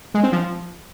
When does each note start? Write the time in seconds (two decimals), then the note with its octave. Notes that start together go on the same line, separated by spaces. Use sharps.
0.14 G#3
0.23 C4
0.32 F3